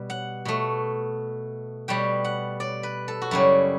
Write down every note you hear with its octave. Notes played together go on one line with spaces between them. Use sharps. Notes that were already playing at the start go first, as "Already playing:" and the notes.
Already playing: B2 G3
F#5
B2 A3
B2 G3 G5
F#5
D5
B4
A4
F#4
F#2 C#3 G3 E4